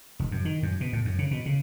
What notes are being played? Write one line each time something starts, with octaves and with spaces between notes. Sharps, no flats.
F1
F#2
D#3
F#2
B2
A2
F#2
C#3
B2
C#3